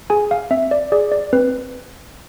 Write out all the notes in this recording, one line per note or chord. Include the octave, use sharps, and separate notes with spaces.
G#4 G#5
F5
C4 E5
D5
G#4 D5
D5
C4 B4